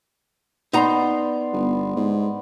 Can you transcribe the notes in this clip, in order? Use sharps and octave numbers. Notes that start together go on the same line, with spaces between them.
B3 D#4 D5 A#5 C6
G1
G#2